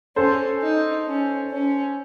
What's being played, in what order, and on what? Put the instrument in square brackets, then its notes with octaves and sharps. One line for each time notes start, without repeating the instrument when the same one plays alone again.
[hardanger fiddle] C#4 [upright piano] A4 C5
[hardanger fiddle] D#4
C#4
C#4